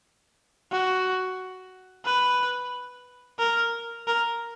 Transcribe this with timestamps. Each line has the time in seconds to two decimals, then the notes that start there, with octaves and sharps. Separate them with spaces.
0.72 F#4
2.05 B4
3.39 A#4
4.07 A#4